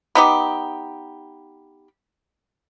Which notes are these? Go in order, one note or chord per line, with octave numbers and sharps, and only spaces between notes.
B3 D#4 G4